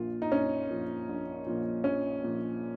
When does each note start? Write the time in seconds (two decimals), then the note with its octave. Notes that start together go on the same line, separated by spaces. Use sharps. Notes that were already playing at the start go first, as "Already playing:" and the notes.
Already playing: A#1 A#2 F3 F4
0.22 D#4
0.31 A#1 C#4
0.69 A#2 F3
1.09 A#1
1.47 A#2 F3
1.84 A#1 C#4
2.24 A#2 F3